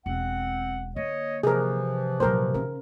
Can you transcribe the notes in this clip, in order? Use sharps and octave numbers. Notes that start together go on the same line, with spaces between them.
E1 C4 F#5
D3 A#3 C#5 D#5
C3 E3 F3 G#4 A#4
A#2 F#3 A#4 C5
C#3 C#4 A#4